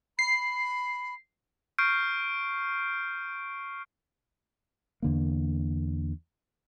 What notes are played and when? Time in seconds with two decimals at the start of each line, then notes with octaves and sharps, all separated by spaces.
0.19 B5 C7
1.78 C#6 F6 G6 C7 D7
5.02 E2 D3 A#3